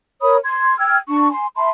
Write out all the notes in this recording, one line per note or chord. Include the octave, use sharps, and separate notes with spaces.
A#4 C#5 B5 D#6
C6 G#6
G5 E6 F6 G#6
D4 C#6
G#5 C6
E5 A5 B5 C6